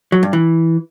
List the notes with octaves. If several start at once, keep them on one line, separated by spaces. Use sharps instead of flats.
F#3
G2
E3